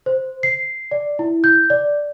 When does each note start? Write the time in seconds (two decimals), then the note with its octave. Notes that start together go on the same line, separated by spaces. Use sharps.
0.06 C5
0.43 C7
0.91 D5
1.19 E4
1.44 G6
1.70 D5